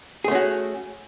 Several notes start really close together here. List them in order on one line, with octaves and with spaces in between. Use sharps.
G#4 A3 C#4 F#4